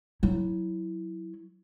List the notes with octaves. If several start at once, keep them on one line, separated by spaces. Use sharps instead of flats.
F#3 E4